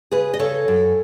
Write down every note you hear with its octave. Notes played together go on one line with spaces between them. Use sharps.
C#3 G#4 B4
D#5
C#3 A4 C#5
F#2